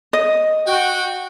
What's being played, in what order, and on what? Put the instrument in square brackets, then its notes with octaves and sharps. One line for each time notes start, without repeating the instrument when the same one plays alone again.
[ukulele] D#5
[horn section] F#4 G5